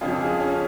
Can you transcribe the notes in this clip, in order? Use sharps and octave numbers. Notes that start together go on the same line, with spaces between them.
F2 C#3 F3 F4
A4
G#4
C#4